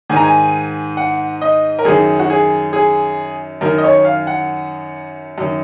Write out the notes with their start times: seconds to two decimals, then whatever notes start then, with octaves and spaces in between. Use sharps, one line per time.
0.09 G#2 D#3 G#5
0.16 A#5
0.24 G#5
0.97 F#5
1.42 D#5
1.79 A#4
1.85 F#2 D#3 G#4
2.19 F#4
2.30 G#4
2.73 G#4
3.61 F#2 D#3 A#4
3.78 D#5
3.84 C#5
4.05 F5
4.27 F#5
5.38 F#2 D#3